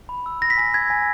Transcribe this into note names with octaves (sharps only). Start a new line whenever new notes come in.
B5
E6
B5 A#6
B6
G#5 A#6
E6 G#6
G#5